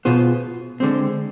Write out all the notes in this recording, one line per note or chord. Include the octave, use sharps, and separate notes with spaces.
B2 B3 F4 G#4 C5
D3 G#3 C4